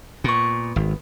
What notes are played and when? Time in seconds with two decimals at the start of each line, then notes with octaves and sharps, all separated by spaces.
0.24 A#2 B3 C#6
0.76 G#1